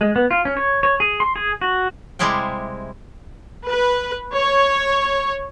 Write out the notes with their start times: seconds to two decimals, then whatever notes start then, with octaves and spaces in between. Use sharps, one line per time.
0.01 G#3
0.16 B3
0.31 F4
0.45 C#4
0.57 C#5
0.83 C#5
1.00 G#4
1.20 C6
1.36 G#4
1.61 F#4
2.19 C3 G3 G#3 E4 F5 G5
3.68 B4
4.34 C#5